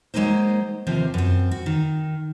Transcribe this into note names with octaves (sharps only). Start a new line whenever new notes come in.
F#3 G#3 A#3 D#4 C5
D#2 C3 F3 C5
F#2 C4
F#4
D#3